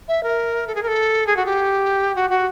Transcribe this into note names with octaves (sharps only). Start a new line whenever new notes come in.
E5
A#4
A4
G#4
A#4
A4
G#4
F#4
G4
F#4
F#4